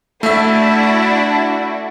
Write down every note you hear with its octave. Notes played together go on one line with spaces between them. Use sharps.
A3 D4 E4 F#4 E5